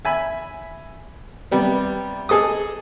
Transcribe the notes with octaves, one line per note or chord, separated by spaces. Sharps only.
E5 G#5 B5
C3 G3 B3
G#4 A4 D#5 D#6